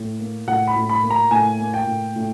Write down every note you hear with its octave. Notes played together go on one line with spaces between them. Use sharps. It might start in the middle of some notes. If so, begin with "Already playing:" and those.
Already playing: A2
A#3
A2 F#5
B5
A2
B5
A#3
A#5
A2 G#5
A#3
G5
A2
A2